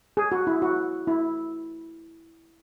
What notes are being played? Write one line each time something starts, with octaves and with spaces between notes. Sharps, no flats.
G#4
F#4
E4
F#4
E4